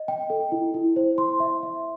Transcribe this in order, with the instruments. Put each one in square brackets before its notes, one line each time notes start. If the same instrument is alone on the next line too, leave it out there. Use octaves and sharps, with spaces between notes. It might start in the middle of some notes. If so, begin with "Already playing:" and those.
Already playing: [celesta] D#5
G5
A4
E4
E4
C5
C6
E5
E5